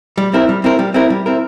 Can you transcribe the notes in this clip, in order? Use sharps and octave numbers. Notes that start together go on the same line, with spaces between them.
G3
C4 E4 A#4
G3
C4 E4 A#4
G3
C4 E4 A#4
G3
C4 E4 A#4